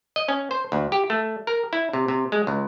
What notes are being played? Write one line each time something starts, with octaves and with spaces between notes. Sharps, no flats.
D#5
C#4
C5
D2
G4
A3
A#4
E4
C3
C3
G#3
C#2